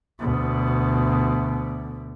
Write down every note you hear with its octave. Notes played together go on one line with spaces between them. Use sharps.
D2 B2